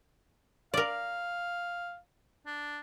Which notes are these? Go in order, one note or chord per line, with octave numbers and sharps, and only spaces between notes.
A#4 D5 F5
D4